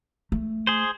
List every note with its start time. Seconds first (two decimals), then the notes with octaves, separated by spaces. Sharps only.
0.32 A3
0.67 G#4 C5